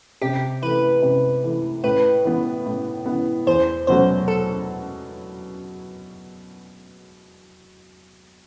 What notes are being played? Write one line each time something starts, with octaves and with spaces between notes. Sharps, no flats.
C3 G4
E3 A3 B4
C3
E3 A3
A2 B4
E3 B3
A2
E3 B3
E2 C5
B2 F#3 A3 C5
A4